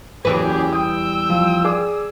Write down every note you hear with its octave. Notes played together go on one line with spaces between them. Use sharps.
F#1 E2 E3 C#4 G4 G#4 B4
G3 G5 D#6 E6
F3
G#4 D5 D6